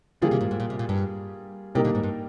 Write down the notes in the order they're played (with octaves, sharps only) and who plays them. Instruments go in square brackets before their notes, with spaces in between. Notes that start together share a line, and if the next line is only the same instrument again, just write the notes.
[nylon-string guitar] D3 F3 [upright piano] G3 A#3 F4 G#4
[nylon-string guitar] C3 D#3
G#2
G#2
A#2
C3
A#2
G2
[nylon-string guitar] C3 [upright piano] G3 A#3 D#4 A#4
[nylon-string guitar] A#2 D3
G#2
G2